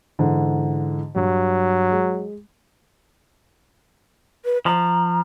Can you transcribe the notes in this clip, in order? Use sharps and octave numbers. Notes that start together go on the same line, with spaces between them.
G#2 D3 E3
G2 F#3
G#3
B4
F3 A#5